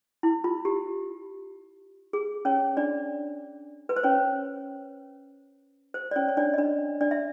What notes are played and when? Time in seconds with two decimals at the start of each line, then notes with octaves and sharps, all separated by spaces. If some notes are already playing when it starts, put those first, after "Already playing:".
0.23 E4
0.44 F4
0.65 G4
2.13 G#4
2.45 C#4 C#5
2.77 D4 D5
3.89 B4
3.96 C5
4.04 C#4 C#5
5.94 C5
6.11 D5
6.16 C#4 C#5
6.28 C#5
6.37 D4 D5
6.54 D#5
6.58 D4 D5
7.01 D4 D5
7.11 E5